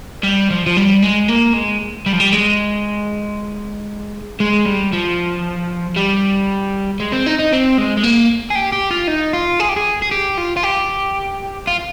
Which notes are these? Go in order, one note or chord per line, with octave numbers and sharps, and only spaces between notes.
G3
F3
F3
G3
G#3
A#3
G#3
G3
F3
G3
G#3
G#3
G3
F3
G3
G#3
C4
D#4
D#4
C4
G#3
G#3
A#3
G#4
G4
G4
F4
D#4
F4
G#4
G4
G#4
G#4
G4
F4
F4
G4
F4